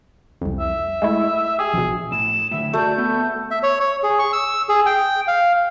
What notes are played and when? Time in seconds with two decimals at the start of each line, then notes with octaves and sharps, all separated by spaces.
0.42 C2 F2
0.60 E5
1.02 G#3 A3 E4
1.59 G4 G#4
1.74 A#1 B2
2.12 A2 E7
2.51 A2 D3 E5
2.73 A3 F#4 D5 G6
2.98 B3
3.51 E5
3.63 C#5
3.80 C#5
4.03 G#4
4.19 C#6
4.33 E6
4.69 G#4
4.86 G5
5.28 F5